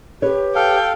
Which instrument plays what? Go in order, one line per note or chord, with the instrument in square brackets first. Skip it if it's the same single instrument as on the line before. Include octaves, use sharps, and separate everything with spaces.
[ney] G4 [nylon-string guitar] B4 C#5
[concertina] A4 F5 [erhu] G5